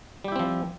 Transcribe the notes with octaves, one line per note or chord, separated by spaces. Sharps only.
F3 G3 C4 E4 G4